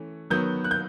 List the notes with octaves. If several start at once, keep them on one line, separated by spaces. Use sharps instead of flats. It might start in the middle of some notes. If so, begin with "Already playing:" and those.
Already playing: E3 A3 C#4
D#3 F#3 B3 G6
F#6
G6